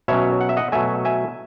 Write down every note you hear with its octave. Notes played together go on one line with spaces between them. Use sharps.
B2 F#3 C#4 C#5 E5
F#5
E5
D#5 F#5
B2 F#3 A3 E5 G#5
E5 G#5